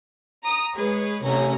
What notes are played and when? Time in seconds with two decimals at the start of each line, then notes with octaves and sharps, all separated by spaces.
0.44 A#5 D#6
0.75 G#3 G#4 B4 C#5
1.24 A1 C3 C#4 A#5